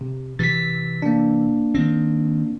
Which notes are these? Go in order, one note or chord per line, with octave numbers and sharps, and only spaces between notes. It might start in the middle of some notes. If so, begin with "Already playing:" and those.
C3
C3 E3 A6 B6
A#3 D4
D#3 C4